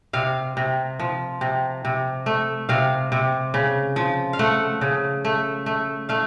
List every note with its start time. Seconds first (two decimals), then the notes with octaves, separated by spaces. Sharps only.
0.13 C3 F5
0.57 C3
1.00 F3
1.41 C3
1.85 C3
2.26 A3
2.69 C3 F5
3.12 C3
3.54 C#3
3.96 F3
4.33 F5
4.39 A3 F#5
4.81 C#3
5.25 A3
5.66 A3
6.09 A3 F5